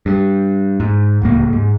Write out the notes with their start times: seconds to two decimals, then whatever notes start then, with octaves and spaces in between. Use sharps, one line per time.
0.06 G2
0.80 G#2
1.22 D1 C#2 A#3
1.53 G#2